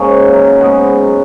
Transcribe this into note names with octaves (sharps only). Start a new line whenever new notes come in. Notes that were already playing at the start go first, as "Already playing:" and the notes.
Already playing: G#2 A#3 C#4 D#4
F#3
G#2 G#3 B3
F#3